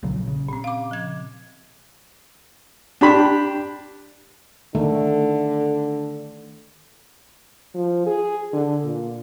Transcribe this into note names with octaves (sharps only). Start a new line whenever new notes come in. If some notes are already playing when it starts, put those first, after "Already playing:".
A#1 C#3 F#3
C#3
A#2 C4
F5 D6
F3 G#6
D4 G4 B5
D3 D#3 A3
F3
G#4
D3
A#2